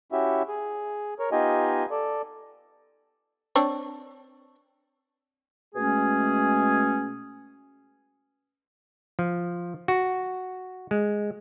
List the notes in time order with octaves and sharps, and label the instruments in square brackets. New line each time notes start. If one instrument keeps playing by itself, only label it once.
[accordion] C#4 E4 F#4 G4 E5
G#4
A#4 C#5
B3 D#4 F4 G4 D#5 G#5
A4 D5
[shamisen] C4 D4 C#5
[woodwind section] B2 G#3 A3 C#4 G#4
[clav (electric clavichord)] F3
F#4
G#3